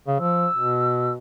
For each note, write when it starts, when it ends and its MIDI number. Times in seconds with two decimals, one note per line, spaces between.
0.07 0.17 49
0.20 0.47 53
0.20 1.13 88
0.55 1.17 47